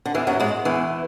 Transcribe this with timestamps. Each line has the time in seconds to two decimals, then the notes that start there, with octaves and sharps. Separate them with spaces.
0.05 D3
0.14 E2 E3
0.27 F#2 F#3
0.40 G#2 G#3
0.65 E2 E3